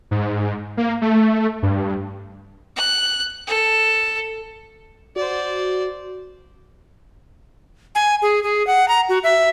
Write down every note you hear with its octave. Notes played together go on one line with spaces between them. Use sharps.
G#2
A#3
A3
G2
F#6
A4
F#4 C5 D5
G#5
G#4
G#4
F#5
A#5
F#4
E5